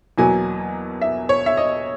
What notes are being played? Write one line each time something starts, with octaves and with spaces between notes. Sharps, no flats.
E2 B2 F#3 A#3 G#5
E5
C#5
E5
D#5